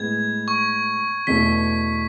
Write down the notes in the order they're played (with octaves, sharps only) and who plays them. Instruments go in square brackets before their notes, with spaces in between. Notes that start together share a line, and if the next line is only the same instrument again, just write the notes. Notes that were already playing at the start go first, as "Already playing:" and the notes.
Already playing: [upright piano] A2 G#3 B3 [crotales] G#6
[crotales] C#6
[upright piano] E2 B2 A3 [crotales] B6